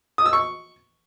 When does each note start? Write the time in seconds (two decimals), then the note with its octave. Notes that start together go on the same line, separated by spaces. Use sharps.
0.18 D#6
0.26 E6
0.33 C#6